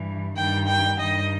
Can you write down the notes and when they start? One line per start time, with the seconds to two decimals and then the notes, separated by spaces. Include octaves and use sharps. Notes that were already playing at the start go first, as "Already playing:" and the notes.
Already playing: G2 E3
0.36 G2 D#3 G5
0.68 G5
0.99 G2 D#3 D#5